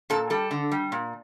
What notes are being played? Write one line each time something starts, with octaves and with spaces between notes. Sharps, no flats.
A#2 A4
G3 A4
D3
G3
A#2